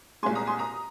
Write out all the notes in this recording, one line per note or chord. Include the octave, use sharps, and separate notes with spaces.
C2 A#2 G#3 G#5 C6
A#5 D#6
G#5 C6
A#5 D#6